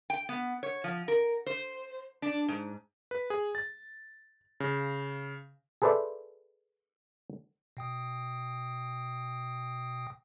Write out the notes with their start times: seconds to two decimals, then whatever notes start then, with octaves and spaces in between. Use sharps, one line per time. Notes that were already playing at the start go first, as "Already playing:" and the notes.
0.10 G5
0.29 B3
0.63 C#5
0.84 F3
1.08 A#4
1.46 C5
2.22 D4
2.48 G#2
3.11 B4
3.30 G#4
3.55 A6
4.60 C#3
5.82 G#4 A4 B4 C5 D5 E5
7.77 B2 G5 D#6